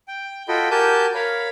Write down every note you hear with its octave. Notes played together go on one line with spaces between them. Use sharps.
G5
F4 F#4 A4 D#5 G5 B5
F#4 G4 A#4 G#5 A5 G6
A#4 C#5 F5 B5